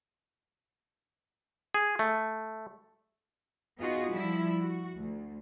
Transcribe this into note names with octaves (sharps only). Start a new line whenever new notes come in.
G#4
A3
B3 D#4 F4 F#4 G#4
F3 G3 E4
F#4
D2